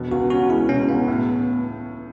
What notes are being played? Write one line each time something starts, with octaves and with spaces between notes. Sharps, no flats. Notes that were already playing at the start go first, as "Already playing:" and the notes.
Already playing: E1 B2
C#2 F#4
C#4 F#4
G#3 E4
B2 C#4
C#2 B3
A2